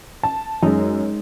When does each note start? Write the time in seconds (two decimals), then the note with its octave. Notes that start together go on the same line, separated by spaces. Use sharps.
0.23 A5
0.63 F#2 G#3 D#4